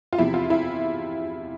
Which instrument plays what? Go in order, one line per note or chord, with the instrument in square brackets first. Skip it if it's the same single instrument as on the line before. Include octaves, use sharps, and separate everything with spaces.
[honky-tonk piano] F4
E2 C3 F3 E4
F4
E4